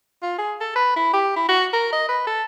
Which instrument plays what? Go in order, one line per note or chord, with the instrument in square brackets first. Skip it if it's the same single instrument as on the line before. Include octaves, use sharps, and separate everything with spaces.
[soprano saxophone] F4
G#4
A4
B4
E4
G4
E4
F#4
A#4
D#5
B4
A4